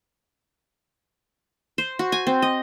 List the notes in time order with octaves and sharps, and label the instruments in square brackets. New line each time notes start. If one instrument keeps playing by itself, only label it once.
[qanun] C5
F#4
G#5
C4
D#5